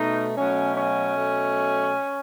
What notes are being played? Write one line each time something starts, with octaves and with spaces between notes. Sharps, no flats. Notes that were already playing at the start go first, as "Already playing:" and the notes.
Already playing: B2 A3 D#4
B2 F#3 A3 C#4
C#4
B2 F#3 A3